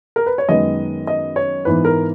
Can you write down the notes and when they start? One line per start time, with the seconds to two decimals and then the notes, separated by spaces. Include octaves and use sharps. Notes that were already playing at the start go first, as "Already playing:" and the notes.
0.16 A#4
0.26 B4
0.38 C#5
0.49 F#2 D#3 G#3 B3 D#5
1.07 D#5
1.36 C#5
1.65 G#2 E3 B3 B4
1.85 A#4